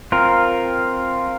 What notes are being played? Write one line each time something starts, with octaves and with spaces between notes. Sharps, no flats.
C4 F4 A#4